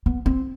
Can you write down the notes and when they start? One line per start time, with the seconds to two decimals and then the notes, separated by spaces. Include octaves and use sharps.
0.06 B3
0.26 C4